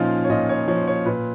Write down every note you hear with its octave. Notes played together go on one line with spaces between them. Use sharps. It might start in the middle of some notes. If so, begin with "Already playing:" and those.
Already playing: A#2 F3 C#4 D#4 F4
C#5
A#2 D#5
C#5
F3 C#5
C#5
A#2 B4